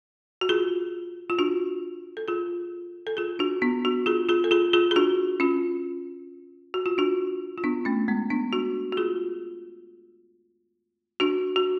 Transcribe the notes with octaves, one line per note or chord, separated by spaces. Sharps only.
F#4
F4 G#4
F4
D4 F#4
A4
F4 G#4
A4
F4 G#4
D4 F#4
B3 D4
D4 F#4
F4 G#4
F4 G#4
A4
F4 G#4
F4 G#4
G#4
D4 F#4
C#4 F4
F#4
F4
D4 F#4
F4
B3 D4
A3 C#4
G#3 B3
B3 D4
D4 F#4
F#4
F4 G#4
D4 F#4
F#4